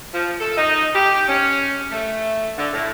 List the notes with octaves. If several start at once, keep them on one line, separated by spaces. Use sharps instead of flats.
F3
A4
D#4
G4
C#4
A3
D3
A2